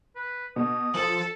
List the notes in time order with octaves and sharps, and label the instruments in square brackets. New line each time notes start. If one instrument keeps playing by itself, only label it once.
[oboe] B4
[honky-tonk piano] B2 [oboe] D#6
[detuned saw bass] F3 [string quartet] A4 [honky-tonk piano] F#7